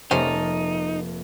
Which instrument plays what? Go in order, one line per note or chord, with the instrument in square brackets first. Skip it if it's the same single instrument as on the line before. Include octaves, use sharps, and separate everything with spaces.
[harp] F1 A#3 A5 [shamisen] G3 C#4 C5 [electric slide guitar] D#4